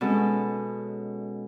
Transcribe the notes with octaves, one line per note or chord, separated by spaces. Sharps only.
B2 G#3 C#4 A4